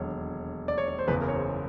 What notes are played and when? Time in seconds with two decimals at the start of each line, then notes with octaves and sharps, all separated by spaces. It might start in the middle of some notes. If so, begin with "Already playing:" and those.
Already playing: E1 D#2 D3 F#3 C#5
0.68 D5
0.78 C#5
0.88 C#5
0.99 C5
1.08 F#1 E2 C#3 B4
1.22 A#4
1.28 C#5
1.35 C5
1.48 C#5